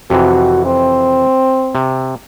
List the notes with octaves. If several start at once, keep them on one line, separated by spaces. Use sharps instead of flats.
F2 C3 E3 F#4
C4
C3